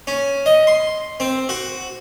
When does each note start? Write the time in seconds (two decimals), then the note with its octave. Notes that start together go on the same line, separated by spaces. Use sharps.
0.07 C#4
0.46 D#5
0.67 C6
1.20 C4
1.49 F#4